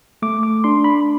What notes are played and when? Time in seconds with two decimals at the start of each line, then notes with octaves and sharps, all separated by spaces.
0.22 A3 D6
0.43 D6
0.64 D4 C6
0.84 B5